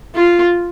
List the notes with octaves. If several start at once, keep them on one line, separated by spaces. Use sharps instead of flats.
F4